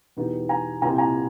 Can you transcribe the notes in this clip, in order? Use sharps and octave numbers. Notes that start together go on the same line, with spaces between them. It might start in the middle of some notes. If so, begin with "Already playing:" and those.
E2 B2 G3 B3 D#4
G#5 A#5
C2 A#2 G3 C4 E4 G#5 A#5
G#5 A#5